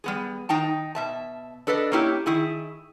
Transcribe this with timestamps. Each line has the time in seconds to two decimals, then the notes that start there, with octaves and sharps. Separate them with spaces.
0.04 G3 B3 G#4
0.49 D#3 D#4 G5 A5
0.95 B2 E5 A5
1.67 D4 A4 B4 D5 D#5
1.92 A#3 C#4 E4 G4
2.26 D#3 E4 G#4